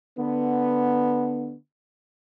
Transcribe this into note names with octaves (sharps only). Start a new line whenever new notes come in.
D3 B3